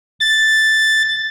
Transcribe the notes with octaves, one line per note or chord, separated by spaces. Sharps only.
A6